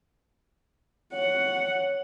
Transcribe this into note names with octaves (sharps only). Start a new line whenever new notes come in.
C#5 F#5